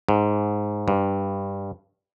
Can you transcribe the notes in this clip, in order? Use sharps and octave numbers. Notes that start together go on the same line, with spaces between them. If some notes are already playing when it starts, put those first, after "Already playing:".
G#2
G2